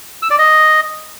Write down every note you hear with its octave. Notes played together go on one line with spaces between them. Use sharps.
E6
D5
D#5